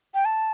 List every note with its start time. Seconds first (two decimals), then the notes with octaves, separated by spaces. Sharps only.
0.14 G5
0.25 A5